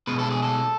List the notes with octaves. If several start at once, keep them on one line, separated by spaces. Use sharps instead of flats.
B2 G#3 B4
A4
G#4
A4